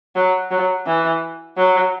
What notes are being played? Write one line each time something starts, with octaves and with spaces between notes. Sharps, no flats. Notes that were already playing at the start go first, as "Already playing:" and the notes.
F#3
F#3
E3
F#3